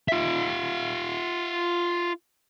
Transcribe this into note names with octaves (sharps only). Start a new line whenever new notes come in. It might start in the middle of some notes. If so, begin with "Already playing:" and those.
F4 E5